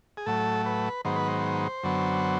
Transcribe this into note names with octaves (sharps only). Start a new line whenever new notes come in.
G#4
A2 F#3 A3 A4
B4
G#2 D#3 F#3 B3 C5
B4
C5
F#2 D3 F#3 B3